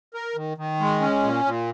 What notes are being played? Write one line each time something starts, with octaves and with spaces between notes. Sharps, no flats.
A#4
D#3
D#3
G#3
C#4
A#2
A#2